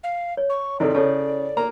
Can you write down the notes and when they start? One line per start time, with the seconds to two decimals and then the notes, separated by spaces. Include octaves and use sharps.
0.04 F5
0.37 C#5
0.50 C#6
0.80 G#1 C3 D#3 E4 A4 D5
0.95 C#3 A4 C#5 A5
1.57 A#3 A#5